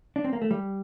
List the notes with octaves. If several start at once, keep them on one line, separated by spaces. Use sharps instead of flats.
D4
C4
A#3
A3
G3